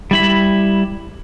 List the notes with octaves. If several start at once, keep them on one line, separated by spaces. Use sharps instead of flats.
G3 E4 B5